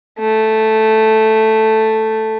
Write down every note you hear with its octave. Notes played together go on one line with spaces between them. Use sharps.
A3